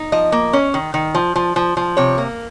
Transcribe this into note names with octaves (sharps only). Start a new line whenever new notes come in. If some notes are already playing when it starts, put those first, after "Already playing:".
Already playing: D#4
F3 D#5
A#3
C#4
D#3
D#3
F3
F3
F3
F3
C3 C#5
A#3